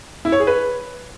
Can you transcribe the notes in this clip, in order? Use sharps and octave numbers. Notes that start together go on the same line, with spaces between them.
E4
C#5
G#4
B4